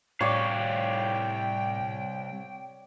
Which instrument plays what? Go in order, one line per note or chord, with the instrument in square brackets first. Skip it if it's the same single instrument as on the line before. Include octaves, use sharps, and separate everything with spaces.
[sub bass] A2 [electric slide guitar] C3 G3 F5 [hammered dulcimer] C#5 D5 [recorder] G5